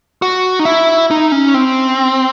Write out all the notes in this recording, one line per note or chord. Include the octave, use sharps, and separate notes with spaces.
F#4
D#4
E4
D#4
C#4
C4